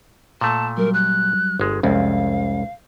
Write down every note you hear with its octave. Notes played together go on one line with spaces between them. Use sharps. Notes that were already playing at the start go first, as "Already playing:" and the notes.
A#2 A3 A5
F#3 G3 A#4
F#6
G1 G#3
C2 F2 G#3 C#4 F5